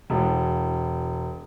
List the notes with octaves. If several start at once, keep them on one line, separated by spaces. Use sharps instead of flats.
E1